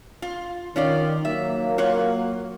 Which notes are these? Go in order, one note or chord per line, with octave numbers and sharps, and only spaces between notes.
F4
D#3 C#4 F4 D5
F#3 A#3 E5
F4 C#5 F#5